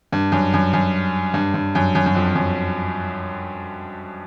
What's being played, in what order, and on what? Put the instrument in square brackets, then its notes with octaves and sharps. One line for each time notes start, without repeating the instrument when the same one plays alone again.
[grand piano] G2
F#2
F#2
F#2
G2
G2
F#2
F#2
F#2
F2
F#2